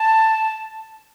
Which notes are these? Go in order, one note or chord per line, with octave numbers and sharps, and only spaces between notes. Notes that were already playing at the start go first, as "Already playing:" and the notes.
Already playing: A5